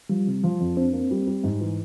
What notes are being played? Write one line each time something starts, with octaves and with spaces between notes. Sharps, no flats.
F3 G3
C3
F3
F2
C4 D4
A#3
G3
G3
G#2
E3